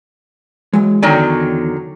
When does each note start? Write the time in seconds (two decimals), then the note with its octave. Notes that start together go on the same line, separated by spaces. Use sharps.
0.73 E3 F#3 G#3
1.02 E2 D3 D#3 F#3 G#5